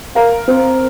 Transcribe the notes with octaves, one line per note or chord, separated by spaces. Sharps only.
A#4 F5
C4